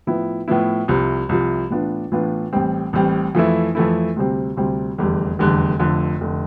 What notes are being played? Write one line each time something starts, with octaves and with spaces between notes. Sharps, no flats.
A2 F3 B3 E4
A2 F3 B3 E4
C2 C3 F3
C2 C3 F3
A2 E3 B3 D4 F4
A2 E3 B3 D4 F4
A1 A2 G3 C4
A1 A2 G3 C4
F2 E3 A3 E4
F2 E3 A3 E4
D2 C3 G3 C4
D2 C3 G3 C4
F1 E2 D3 G3
F1 E2 D3 G3
F1 F2 D3
F1 D3